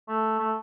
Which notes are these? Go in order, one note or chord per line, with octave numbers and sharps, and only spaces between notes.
A3
A3